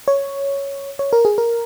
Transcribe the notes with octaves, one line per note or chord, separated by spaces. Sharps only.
C#5
C#5
A#4
G#4
A#4